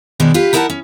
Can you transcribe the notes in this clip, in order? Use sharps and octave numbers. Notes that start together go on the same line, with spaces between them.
B2 D#3 G#3 D4
F4 G4 B4
D#4 E4 A#4 F5 F#5 A5
C#4